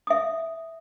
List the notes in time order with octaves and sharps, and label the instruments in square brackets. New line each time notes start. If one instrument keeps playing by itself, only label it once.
[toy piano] E5 D#6